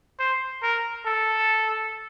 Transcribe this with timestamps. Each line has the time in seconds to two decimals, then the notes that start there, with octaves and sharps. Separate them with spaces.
0.19 C5
0.63 A#4
1.06 A4